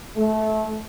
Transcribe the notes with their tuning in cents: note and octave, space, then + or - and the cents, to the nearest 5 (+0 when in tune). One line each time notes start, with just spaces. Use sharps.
A3 -20